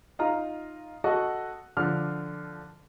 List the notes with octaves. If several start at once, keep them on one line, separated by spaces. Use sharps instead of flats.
D#4 F4 A#5
F#4 A4 D#5 F#5
D3 F3 D4 F6